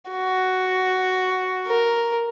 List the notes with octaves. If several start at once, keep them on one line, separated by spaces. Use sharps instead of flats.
F#4
A#4